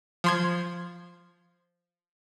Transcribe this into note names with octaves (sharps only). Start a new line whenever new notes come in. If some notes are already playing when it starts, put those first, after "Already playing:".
F3 C6 G#6